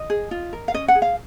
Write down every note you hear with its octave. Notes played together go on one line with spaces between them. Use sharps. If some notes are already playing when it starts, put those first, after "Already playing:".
Already playing: D#5
G#4
F4
A#4
F5
C#4 D#5
F#5
G#4
F5